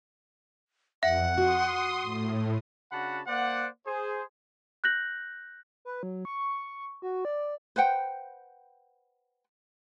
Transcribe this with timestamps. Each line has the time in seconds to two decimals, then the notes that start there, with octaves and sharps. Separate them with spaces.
1.03 F2 E5 F#5
1.38 F#4 C6 D#6
2.03 A2
2.92 C#3 D4 F#4 F#5 A5 B5
3.26 A#3 C5 D5 F#5
3.86 G#4 C5
4.84 F#6 G6 A#6 F#7
5.85 B4
6.03 F#3
6.25 C#6
7.02 F#4
7.25 D5
7.76 B4 C5 F#5 G5